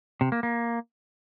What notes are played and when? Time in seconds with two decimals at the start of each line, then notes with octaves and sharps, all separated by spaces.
0.21 C3
0.32 A#3
0.43 A#3